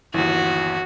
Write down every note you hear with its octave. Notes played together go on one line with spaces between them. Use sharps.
G1 D#2 E3 F#4